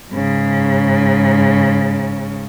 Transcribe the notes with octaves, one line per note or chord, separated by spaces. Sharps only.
G#2 C#3